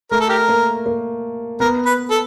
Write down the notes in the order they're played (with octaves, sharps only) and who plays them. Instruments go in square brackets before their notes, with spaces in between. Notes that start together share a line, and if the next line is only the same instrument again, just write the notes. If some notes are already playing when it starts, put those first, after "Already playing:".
[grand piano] A3 [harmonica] A#4
[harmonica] A4
G4 A#4
[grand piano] A#3
A#3
[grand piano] B3 [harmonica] A#4
[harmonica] B4
A4